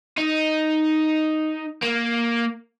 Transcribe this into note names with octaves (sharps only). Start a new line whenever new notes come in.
D#4
A#3